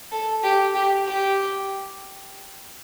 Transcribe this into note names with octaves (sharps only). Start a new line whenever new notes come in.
A4
G4
G4
G4